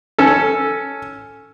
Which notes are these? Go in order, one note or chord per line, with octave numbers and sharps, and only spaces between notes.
C#4 A4